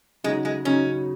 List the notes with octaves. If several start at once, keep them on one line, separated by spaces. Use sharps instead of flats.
C#3 F#3 G#3 D#4 F#4
G#3
C#3 F#3 C#4 D#4